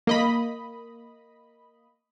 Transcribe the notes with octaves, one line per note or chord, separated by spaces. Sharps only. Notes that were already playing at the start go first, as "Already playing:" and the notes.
A#3 D#5 B5